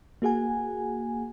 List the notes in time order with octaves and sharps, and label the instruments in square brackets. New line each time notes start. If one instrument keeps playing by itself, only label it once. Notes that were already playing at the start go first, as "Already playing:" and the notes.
[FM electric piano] A#3 F#4 G#4 F#5 G#5